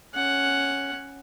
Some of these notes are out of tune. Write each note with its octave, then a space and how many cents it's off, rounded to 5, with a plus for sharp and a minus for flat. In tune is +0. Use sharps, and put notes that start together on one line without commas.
C#4 +0 F#5 +5